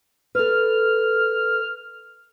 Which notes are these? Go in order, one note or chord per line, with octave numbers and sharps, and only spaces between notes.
A4 B4 F6